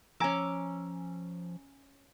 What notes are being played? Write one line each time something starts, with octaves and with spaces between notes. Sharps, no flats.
F3 C#4 G#5 A#5 D6 E6